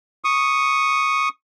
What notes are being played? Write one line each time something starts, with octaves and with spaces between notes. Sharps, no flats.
C#6 D#6